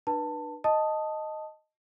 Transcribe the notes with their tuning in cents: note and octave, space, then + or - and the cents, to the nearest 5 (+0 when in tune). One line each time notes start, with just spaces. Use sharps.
D4 +40 B4 -25 A5 +15
D#5 +0 A5 +5 D#6 +0